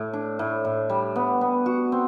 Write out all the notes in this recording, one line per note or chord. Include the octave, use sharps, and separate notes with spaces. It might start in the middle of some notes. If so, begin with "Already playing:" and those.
Already playing: A2
D4
A2
A2
G3
B3
B3
F#4
C4